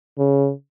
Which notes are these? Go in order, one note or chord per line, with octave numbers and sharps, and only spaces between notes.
C#3